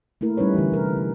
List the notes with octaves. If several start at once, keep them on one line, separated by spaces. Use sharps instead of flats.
A3 A#3 E4 A#4
G3 C#4 D#4 B4 C#5
D3 E3
C3 A#4
D3